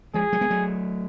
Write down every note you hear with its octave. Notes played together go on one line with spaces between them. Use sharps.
F3 G#3 G#4
F#3 A3
G#3 B3
F#3 A3